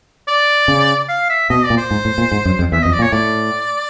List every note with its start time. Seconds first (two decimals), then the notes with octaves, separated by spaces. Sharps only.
0.28 D5
0.68 C#3
1.09 F5
1.30 E5
1.50 B2 D#5
1.64 D5
1.70 A#2
1.78 C5
1.91 G#2
2.05 A2
2.18 A#2
2.32 G#2
2.45 F#2
2.59 F2
2.72 E2 E5
2.83 F2 D#5
2.93 D5
2.99 A#2
3.02 C#5
3.12 A2 D5